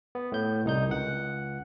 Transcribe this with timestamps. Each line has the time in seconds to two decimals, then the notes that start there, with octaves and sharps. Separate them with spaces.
0.15 B3
0.32 A2 G6
0.65 C2 D#4 G6
0.89 C#2 F#5